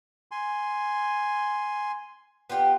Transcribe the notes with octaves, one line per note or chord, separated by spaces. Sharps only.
G#5 C6
B3 F4 G4